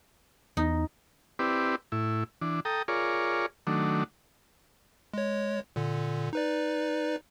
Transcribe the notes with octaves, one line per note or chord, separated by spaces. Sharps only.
E2 D#4
C4 E4 G4 B4 D5
A2 E4
E3 D4
A4 G5 A#5 D#6
F4 G#4 A#4 C#5 D5
D#3 F#3 A3 D4
G#3 C#5
A#2 D3
D#4 B4 D5